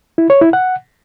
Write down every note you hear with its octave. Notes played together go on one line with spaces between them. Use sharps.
E4
C#5
E4
F#5